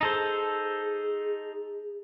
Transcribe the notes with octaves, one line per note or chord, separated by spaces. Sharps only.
D#4 G#4 A4 C5